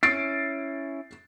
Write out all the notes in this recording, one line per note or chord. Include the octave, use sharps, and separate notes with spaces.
C#4 E4 A6 C7 D7